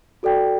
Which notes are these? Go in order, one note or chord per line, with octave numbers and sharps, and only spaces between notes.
F#4 A4 D5 G5